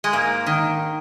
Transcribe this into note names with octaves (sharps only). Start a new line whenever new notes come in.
G#3
G#2 A#3
D#3